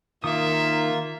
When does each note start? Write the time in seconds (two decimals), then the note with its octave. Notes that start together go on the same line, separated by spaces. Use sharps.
0.24 D#3 A#3 F4 E5 D#6